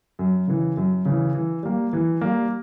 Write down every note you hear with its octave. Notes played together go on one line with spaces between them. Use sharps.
F#2
C#3 E3
F#2
C#3 E3
E3
G3 A#3
E3
G3 A#3